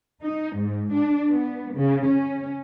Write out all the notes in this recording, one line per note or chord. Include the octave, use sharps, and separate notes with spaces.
D#4
G#2
D4
B3
C#3
C#4